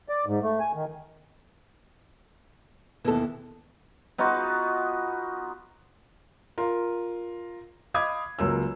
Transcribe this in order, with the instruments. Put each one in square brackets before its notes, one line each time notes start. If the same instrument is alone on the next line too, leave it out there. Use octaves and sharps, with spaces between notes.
[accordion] D5
G#2
A3
G#5
D#3
[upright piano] D#2 B2 [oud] E3 A4
[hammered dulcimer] B3 D#4 F4 F#4
[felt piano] F4 A#4
D#5 F5 B5 D6 D#6 G#6
C#2 F#3 A#3 E6